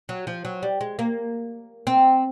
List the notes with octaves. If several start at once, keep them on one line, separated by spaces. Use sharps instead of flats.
F#3
F3
F#3
G3
G#3
A#3
C4